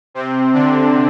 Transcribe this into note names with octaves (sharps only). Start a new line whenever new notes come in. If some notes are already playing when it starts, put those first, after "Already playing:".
C3 C4
D3 D4